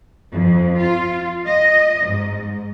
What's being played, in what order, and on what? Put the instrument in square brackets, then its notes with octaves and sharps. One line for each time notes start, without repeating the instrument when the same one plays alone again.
[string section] F2
F4
D#5
G#2